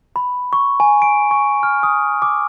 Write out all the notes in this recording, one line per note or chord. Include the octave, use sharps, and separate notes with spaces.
B5
C#6
G#5
D7
C#6
F6
D#6
D6